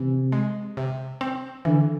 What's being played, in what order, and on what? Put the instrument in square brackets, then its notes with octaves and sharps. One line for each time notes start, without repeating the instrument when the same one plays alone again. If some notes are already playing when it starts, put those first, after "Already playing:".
Already playing: [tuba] C3 [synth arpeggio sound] E3
[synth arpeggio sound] G#3
C3
C4
[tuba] D3 [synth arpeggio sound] E3